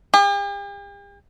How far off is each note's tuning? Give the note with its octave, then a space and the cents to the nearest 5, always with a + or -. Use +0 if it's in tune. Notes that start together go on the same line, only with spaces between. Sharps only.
G4 +45